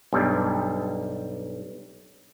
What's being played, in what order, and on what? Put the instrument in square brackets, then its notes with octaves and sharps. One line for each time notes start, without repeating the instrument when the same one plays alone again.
[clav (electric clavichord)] B1 G2 G3